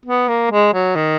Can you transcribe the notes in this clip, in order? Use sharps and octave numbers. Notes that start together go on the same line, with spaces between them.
B3
A#3
G#3
F#3
D#3